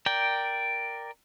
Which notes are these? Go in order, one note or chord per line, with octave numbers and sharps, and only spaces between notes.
A#4 D5 G5